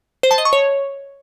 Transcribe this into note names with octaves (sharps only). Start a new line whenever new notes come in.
C5
A5
D#5
C#6
C#5